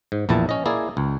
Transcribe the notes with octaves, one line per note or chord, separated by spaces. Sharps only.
G#2
A#1 E2 A#2 E4 A5
C#4 D#5
A#3 E4 G#4 D5
C#2